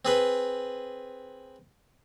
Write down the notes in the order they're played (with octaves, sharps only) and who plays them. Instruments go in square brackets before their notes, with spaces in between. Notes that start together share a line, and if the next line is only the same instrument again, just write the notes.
[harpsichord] C4 G#4 B4